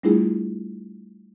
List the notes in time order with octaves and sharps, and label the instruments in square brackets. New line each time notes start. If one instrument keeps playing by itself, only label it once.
[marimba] G3 A3 D4 E4 F4 G#4